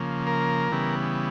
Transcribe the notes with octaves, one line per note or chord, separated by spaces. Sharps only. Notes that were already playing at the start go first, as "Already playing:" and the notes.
Already playing: C#3 F3 A#3
A#4
C#3 E3 G3 B3